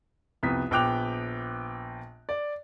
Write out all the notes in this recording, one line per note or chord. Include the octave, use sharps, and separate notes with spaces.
C2 F2 B3 D#6 B6
A#1 B3 G5 D6 F#6 F7
D5